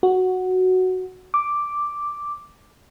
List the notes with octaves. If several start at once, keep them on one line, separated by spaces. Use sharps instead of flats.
F#4
D6